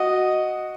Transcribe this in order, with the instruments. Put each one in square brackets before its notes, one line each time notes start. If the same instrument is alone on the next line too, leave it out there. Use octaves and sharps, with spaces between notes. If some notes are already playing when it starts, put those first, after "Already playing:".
Already playing: [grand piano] F#4 [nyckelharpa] D#5